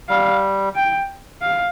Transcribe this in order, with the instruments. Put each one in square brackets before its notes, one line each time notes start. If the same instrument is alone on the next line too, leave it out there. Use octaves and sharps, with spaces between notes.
[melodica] G3 [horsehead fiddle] F5
[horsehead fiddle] G5
F5